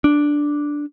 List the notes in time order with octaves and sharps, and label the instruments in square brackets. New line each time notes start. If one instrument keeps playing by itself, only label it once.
[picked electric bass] D4